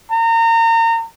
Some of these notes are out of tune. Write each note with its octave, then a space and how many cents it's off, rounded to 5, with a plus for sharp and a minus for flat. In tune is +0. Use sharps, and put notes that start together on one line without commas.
A#5 -30